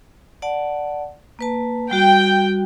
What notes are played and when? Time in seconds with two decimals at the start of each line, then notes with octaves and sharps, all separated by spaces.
0.42 D5 F#5 A5
1.39 A#3 B4 A5
1.91 G3 F#4 G5